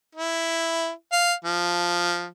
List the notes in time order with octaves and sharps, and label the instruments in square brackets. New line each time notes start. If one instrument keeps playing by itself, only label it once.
[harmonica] E4
F5
F3